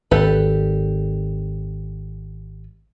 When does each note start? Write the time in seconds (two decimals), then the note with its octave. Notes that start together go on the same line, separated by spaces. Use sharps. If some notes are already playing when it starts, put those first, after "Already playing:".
0.11 G#1 G4 A4 B4